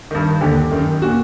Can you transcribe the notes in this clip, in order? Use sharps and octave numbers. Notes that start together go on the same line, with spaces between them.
G2 D#3
D#2 D3 G4
F#2 D#3
A#2 F#4